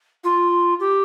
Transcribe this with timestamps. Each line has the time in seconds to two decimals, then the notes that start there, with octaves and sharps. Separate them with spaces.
0.24 F4
0.80 G4